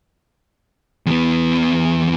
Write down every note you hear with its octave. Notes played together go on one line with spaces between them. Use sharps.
E2 B3